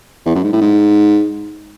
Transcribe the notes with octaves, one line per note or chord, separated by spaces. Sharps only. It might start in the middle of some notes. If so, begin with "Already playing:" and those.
E2
F#2
G#2
A2
G#2